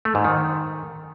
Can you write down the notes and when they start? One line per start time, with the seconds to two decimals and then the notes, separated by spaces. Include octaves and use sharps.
0.05 A3
0.15 G#2
0.24 D#3